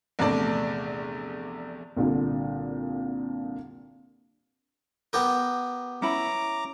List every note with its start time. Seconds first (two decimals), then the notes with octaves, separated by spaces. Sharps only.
0.19 A#1 E2 C3 A3 D5 A5
1.96 C2 A#2 D3
5.13 B3 G4 A#4
6.02 C#4 E4 A#5 B5 D6